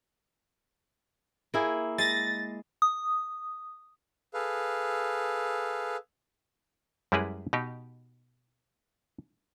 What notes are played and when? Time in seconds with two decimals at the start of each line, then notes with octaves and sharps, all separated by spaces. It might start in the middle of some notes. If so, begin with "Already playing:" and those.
1.54 A#3 E4 G#4
1.98 G#3 A6 A#6
2.82 D#6
4.34 G#4 A4 B4 F5
7.12 F#2 G3 G#3 E4 G#4 B4
7.53 B2 D#4 G4